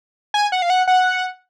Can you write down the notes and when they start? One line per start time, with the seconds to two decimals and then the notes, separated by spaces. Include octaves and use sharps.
0.34 G#5
0.52 F#5
0.62 F5
0.70 F#5
0.88 F#5